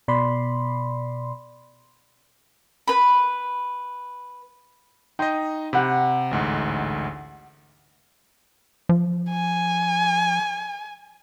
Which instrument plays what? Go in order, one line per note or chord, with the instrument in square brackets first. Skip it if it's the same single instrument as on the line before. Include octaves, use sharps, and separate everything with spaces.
[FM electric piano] B2 D5 B5 C6
[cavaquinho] B4 B5
[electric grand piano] D#4 D#5 [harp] G5 C6
[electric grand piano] C3 [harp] G4 F#5 B5
[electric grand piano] A1 D2 G#2
[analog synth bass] F3
[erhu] G#5